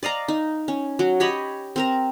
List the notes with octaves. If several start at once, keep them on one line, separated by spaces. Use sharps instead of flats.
D5 D#5 F5 A#5
D#4
C#4
F#3
G4 C#5 D#5 B5
C4 A#4 A#5